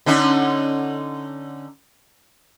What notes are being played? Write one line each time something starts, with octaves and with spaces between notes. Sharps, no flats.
D3 C#4 D#4